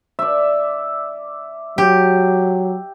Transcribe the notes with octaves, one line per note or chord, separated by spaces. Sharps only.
D5 E5
F#3 G4